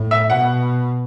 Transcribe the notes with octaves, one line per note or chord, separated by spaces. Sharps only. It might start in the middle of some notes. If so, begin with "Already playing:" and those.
Already playing: A2
E5
B2 F#5